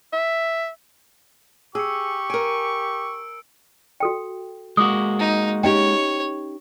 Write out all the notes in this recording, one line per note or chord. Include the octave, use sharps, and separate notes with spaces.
E5
G4 G#4 C#6 E6 C#7
A#4 G#5 D7
F#4 A4 G5
G#3 A#3 F#4 D6 D#6
D#4
C#4 D#4 G4 C#5 G5